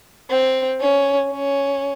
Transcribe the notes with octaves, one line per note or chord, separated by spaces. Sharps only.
C4
C#4
C#4